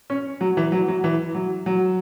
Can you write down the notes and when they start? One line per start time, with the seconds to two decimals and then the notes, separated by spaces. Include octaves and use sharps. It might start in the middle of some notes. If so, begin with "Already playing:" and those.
0.10 C#4
0.41 F#3
0.57 E3
0.72 F#3
0.88 F#3
1.04 E3
1.35 F#3
1.66 F#3